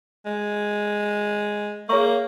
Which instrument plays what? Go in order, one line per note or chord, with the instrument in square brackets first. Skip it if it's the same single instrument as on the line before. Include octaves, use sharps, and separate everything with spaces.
[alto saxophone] G#3
[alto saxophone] A#3 [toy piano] G#4 C#5 E5 A#5 C#6